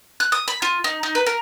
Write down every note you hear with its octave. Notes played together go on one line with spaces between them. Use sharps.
F#6
D#6
B5
F4
D#4
D#4
B4
A#4